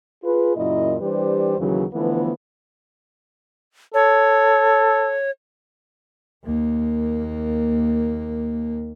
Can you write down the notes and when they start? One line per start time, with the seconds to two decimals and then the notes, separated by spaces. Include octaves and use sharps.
0.24 F4 G#4 B4
0.56 F#2 A#2 C#3 E4 D#5
1.00 E3 G3 D4 G4 B4 C5
1.58 D#2 C#3 E3 F#3
1.93 D3 E3 F3 A3 B3
3.94 A4 C#5
6.44 D#2 A#3